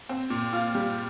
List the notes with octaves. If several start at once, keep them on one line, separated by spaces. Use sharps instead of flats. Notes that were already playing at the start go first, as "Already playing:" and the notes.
C4
A#2
F4
G3